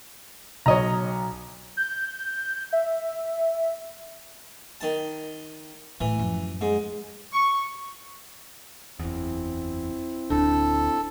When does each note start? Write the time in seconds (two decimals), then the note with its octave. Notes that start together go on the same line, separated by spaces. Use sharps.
0.66 B1 C#5 D#5 A#5
1.77 G6
2.73 E5
4.81 D#3 A5
6.01 A2 E3
6.19 F#2 F3
6.61 G#2
7.32 C#6
8.99 F#1 E2 C4 E4
10.30 D1 D2 D4 A4